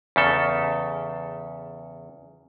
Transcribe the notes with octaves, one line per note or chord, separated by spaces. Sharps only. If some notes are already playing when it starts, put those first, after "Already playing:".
E2 C#3 A4